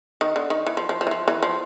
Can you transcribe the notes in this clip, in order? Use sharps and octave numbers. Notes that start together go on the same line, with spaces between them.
D#3
D3
D#3
E3
F3
F3
F3
E3
F3
E3
F3